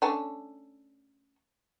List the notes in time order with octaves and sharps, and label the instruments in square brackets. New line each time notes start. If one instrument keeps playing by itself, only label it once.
[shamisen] A3 C#4 D4